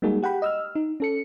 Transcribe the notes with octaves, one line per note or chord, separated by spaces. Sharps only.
G3 G#3 A#3 D#4 F#4 G#4
G4 F#5 G5 B5
D#5 E6 F6
D#4
C#4 A4 C#7